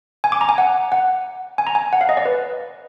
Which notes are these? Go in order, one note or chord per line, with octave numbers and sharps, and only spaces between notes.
G#5
D6
A#5
G#5
F#5
F#5
G#5
A#5
G#5
F#5
F5
D#5
D5
B4